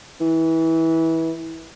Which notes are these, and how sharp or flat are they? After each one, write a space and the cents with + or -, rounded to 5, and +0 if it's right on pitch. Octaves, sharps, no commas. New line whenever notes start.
E3 -20